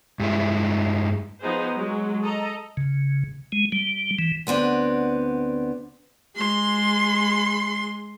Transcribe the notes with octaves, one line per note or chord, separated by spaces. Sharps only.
G2 G#3 E4
F3 B3 D#4 G#4 C5
F#3 G#3
A4 D#5 A#5
C#3
G#3
G3
E3
D2 B3 C4 D4
G#3 C6